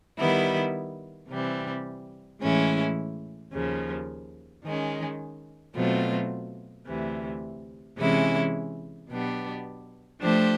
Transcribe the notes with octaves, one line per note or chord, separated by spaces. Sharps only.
D#3 G3 B3 E4
C3 E3 G3 C4
A2 E3 G#3 C#4 E4
D#2 C#3 F3
D#3 G#3 C#4
B2 F#3 A3 C4 F4
D2 C3 E3
C3 E3 G#3 C#4 E4
B2 F#3 B3 D4 G4
F3 A3 D4 G4 C5